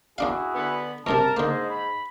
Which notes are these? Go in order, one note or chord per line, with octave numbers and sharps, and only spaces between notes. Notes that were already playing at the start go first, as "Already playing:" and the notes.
E2 D4 E4 F#4 G#4 F5
D3 B3
E2 G2 C3 A#4 A5
G#2 D3 A#3 C5 D#5
B5